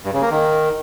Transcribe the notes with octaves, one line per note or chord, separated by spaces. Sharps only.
G2
C#3
A#3
D#3